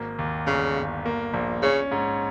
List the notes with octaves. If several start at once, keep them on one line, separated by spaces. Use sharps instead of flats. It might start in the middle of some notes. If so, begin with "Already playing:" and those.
Already playing: G#1 A#3
D#2
G1 C#3
G1
A#3
A#1
C#3 C#4
G#2